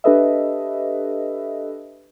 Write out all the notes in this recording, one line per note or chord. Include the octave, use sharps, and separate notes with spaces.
D4 G4 A4 B4 D#5 E5